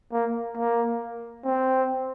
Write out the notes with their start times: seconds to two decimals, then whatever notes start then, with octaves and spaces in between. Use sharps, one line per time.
0.12 A#3
0.57 A#3
1.45 C4